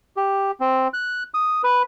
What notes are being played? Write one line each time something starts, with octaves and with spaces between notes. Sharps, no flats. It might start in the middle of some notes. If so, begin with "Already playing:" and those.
G4
C4
F#6
D#6
B4